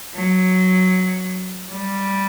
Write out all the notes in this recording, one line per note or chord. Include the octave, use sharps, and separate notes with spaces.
F#3
G3